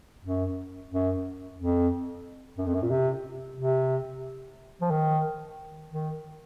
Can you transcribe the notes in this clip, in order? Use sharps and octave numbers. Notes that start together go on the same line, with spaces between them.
F#2
F#2
F2
F#2
F2
F#2
A#2
C3
C3
F3
D#3
D#3